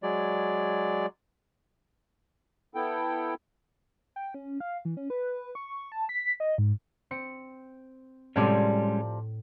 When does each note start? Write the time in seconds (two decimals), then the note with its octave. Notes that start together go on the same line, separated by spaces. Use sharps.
0.03 F#3 G#3 D5
2.75 B3 E4 A4 G5
4.16 G5
4.34 C#4
4.60 F5
4.85 E3
4.97 C#4
5.10 B4
5.55 C#6
5.92 A5
6.09 B6
6.40 D#5
6.58 G#2
7.11 C4 C#7
8.36 A2 C3 F3 G3 G#3 C#4 D5